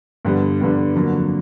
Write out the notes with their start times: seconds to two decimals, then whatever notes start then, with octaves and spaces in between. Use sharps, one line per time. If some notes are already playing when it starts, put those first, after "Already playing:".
0.25 G2 D3 G3 B3
0.60 G2 D3 G3 B3
0.95 F2 D3 F#3 A#3